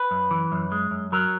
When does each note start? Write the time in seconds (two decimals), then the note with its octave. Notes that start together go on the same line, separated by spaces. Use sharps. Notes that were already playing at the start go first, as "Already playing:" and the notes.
Already playing: B4
0.11 F#2
0.31 E3
0.52 F#2
0.72 G#3
0.91 F#2
1.12 F#3 A#4